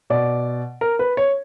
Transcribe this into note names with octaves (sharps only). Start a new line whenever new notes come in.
B2 D5
A#4
B4
C#5